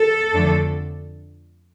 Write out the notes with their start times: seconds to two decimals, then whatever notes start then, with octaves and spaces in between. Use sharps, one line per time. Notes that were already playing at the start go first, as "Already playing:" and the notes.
Already playing: A4
0.32 F2 D3 F3 A3 D4